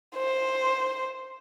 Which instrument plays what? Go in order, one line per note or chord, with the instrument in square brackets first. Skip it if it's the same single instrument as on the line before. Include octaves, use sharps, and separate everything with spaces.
[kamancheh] C5